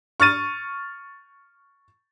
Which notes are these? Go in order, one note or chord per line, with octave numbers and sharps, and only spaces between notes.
C#6 F6 A6 D#7